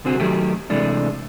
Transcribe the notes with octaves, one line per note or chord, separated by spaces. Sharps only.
C2 D3 C4 F#4 G#4
D#3 F#3 A3 G4
C3 E3 G#3 A3 D4